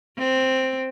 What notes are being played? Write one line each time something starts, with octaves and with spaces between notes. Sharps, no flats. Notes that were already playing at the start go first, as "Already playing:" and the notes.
C4